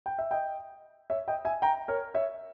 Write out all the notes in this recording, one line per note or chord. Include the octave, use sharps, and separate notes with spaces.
G5
E5
D#5 G5
C#5 E5
D#5 G5
E5 G#5
G5 A#5
A#4 C#5
C#5 E5